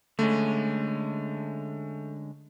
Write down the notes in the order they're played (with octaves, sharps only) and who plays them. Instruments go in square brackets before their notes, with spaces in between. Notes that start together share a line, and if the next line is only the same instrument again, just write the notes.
[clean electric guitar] D3 G#3 C#4 [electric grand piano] A3